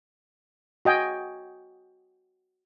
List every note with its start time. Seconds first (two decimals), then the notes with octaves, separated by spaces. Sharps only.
0.85 F#4 D#5 G5 G#5